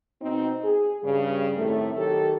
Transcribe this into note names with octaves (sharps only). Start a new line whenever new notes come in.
B2 C4 D#4
G#4
G2 C#3 G3
A2 C3 D#3 A3
D#3 F#3 G4 A4 A#4 C#5